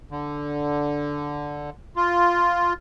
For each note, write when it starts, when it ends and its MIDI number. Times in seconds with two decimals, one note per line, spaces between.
0.11 1.70 50
1.96 2.73 65